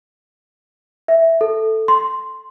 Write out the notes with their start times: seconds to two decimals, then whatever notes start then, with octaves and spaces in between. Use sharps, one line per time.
1.08 E5
1.41 A4
1.88 C6